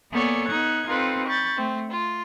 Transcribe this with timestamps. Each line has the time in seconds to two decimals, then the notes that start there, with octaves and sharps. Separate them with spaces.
0.12 A#3 B3 A4 C#5 D5 G#5
0.47 B3 D#4 F#6 G#6
0.88 C4 D#4 F4 A4 B4
1.26 B5 C#6 G6 A6
1.55 A3 C4
1.89 F4